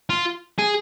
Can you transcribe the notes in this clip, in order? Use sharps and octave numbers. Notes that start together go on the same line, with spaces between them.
F4
G#4